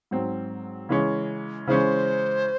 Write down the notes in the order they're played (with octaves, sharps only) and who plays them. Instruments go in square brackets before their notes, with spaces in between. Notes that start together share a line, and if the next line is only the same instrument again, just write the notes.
[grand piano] G#2 F#3 C4
C#3 E3 G#3 C#4
[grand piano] C#3 E3 G#3 C#4 [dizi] C5